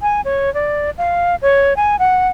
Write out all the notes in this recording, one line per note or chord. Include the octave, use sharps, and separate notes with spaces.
G#5
C#5
D5
F5
C#5
G#5
F#5